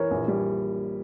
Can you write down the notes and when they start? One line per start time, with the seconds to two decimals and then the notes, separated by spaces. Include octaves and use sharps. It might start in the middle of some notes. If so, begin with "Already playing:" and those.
Already playing: E3 A#4 C#5
0.11 A#1
0.28 G3